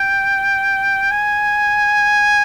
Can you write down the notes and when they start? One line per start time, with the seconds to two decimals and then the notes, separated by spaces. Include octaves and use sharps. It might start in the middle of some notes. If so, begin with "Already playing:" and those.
Already playing: G5
1.11 G#5